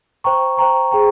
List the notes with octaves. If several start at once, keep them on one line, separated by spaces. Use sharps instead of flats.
C5 G5 A#5 C#6
C5 G5 A#5 C#6
G#4 C5 G5 A#5 C#6